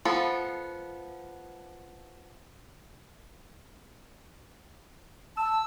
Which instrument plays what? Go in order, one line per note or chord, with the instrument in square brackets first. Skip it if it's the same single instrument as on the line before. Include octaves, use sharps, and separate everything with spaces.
[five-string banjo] F3 B3 A4
[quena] A5 [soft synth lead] E6